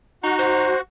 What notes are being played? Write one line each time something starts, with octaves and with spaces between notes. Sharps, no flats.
D#4 F#4
C5